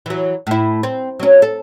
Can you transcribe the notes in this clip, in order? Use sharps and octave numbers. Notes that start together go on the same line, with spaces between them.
E3 F#3
A2 E4
C4
F#3 C#4
A4